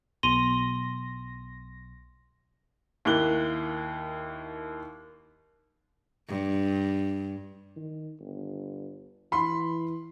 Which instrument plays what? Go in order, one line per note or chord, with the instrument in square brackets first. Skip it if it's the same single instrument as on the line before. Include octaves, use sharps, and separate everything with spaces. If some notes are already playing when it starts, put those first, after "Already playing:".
[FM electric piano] B1 A#6 [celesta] C6 D#7 G7
[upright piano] D#2 A#3 E4 F#6 G7
[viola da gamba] G2
[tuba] D#3
G1
[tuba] E3 [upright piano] B5 C6